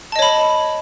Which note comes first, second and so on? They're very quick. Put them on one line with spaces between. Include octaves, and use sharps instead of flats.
A5 D#5 C#5 B5